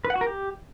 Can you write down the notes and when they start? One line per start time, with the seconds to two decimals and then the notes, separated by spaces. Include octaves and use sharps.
0.05 B4
0.10 F#5
0.16 F#4
0.21 A#4
0.27 G4